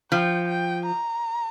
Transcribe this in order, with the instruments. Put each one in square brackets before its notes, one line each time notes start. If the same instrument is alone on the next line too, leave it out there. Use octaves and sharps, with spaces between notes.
[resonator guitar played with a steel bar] F3 [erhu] G5
[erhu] G5
A#5